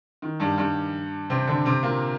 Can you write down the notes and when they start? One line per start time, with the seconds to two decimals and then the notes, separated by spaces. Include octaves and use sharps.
0.22 D#3
0.40 G2 G3
0.58 G2 G3
1.30 C3 C4
1.47 D3 D4
1.65 C3 C4
1.83 A#2 A#3